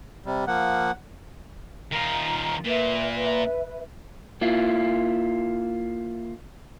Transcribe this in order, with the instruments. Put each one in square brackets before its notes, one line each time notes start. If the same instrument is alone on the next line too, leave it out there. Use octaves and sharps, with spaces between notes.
[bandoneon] C3 G3
[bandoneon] F3 A#3 [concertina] F#5
[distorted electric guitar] D#3 F4 [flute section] A#5
[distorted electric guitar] A#2 [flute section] B4 E5
[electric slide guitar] A#3 E4 F4